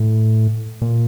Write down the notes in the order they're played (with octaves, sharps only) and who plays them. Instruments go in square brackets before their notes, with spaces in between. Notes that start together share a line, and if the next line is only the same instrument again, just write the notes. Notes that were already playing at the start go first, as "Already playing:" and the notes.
Already playing: [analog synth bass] A2
A#2